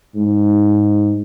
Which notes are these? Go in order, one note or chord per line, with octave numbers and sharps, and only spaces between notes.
G#2